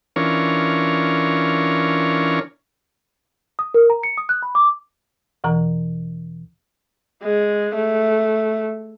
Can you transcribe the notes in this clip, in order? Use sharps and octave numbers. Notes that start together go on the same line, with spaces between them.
E3 C#4 D4 F4 A#4 C#5
D#6
A#4
A#5
C#7
D#6
F#6
B5
D6
E2 B2 E3 A#5
G#3
A3